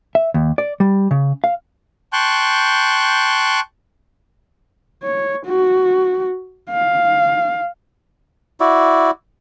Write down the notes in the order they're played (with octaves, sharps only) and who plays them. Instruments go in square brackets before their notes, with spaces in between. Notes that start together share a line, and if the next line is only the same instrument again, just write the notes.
[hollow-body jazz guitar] E5
D#2
D5
G3
C#3
F5
[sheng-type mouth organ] G5 A5 C6 C#6 F#6 G6
[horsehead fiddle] C#5
F#4
F5
[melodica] E4 F#4 D5